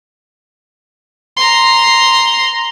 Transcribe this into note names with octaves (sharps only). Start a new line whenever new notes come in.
A#5 C6